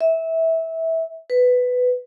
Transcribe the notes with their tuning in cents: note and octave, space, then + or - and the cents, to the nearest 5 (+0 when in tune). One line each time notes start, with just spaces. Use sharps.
E5 -20
B4 +10